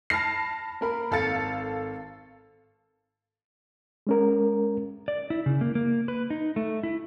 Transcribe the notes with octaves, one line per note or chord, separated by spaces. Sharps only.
A5 B5 F6 A#6 C7
A#3 A#4 B5
G#1 A4 F5 A6 C#7
G#3 C#4 A#4
D5
E4
C#3
A#3
A#3
B4
D#4
A3
E4